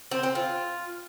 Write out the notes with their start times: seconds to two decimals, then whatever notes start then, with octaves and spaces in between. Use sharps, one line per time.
0.11 C4
0.23 C4
0.35 F4